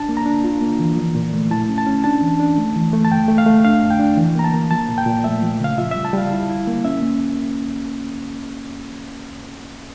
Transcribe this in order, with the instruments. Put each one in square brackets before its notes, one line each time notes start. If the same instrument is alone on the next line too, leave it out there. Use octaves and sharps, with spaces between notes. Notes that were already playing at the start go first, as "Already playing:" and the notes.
Already playing: [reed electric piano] D4 A5
A#3
A#5
D4
F4
A#3
E3
F3
A#2
A3
E4 A5
C#4
A5
C#4
D4 A5
E3
D4
A3
E3
A3
A5
G2 G5
A3
F5
A3
D4 F5
F2
G5
D4
E3
A#3 A#5
A5
A#3
F3 A5
A#2
G5
A#2
A3 E5
F3
C#3 F5
F4 E5
G3 E5
A5
G3 F5
E4
E4
A#3
C#4 E5
A#3